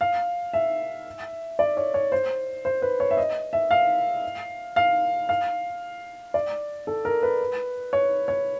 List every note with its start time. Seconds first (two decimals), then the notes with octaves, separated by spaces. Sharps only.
0.01 F5
0.53 E5
1.59 D5
1.77 C#5
1.94 C#5
2.12 C5
2.65 C5
2.82 B4
3.00 C#5
3.11 E5
3.17 D#5
3.53 E5
3.71 F5
4.76 F5
5.29 F5
6.34 D5
6.87 A4
7.05 A#4
7.23 B4
7.93 C#5
8.28 C#5